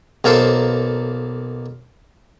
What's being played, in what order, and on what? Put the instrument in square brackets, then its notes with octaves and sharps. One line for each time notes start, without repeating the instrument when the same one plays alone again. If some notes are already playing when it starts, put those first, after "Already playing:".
[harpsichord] B1 A#3 A4 C5